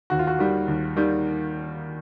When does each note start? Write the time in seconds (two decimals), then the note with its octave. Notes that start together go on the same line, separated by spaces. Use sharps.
0.10 D#2 F#4
0.19 F4
0.27 F#4
0.39 D#3 G3
0.68 D#2
0.96 D#3 G3